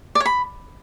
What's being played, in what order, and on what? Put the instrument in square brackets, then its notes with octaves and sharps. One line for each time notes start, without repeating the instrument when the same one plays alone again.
[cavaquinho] D5
C#5
B5